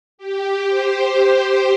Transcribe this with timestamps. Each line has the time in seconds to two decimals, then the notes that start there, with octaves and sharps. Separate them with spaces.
0.18 G4
0.67 C5